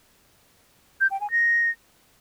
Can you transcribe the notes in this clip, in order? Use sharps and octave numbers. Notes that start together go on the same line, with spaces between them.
G6
G5
G#5
A#6